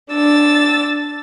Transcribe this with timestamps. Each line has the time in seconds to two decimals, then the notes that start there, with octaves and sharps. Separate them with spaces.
0.11 D4 E6 A6